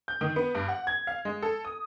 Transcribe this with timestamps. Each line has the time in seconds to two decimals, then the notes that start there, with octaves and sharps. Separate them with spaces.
0.08 G6
0.21 D#3
0.36 B3
0.55 G2
0.68 F#5
0.87 G#6
1.07 F5
1.25 G#3
1.42 A4
1.65 D#6